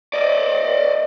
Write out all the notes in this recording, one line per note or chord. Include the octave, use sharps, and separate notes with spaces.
D5 D#5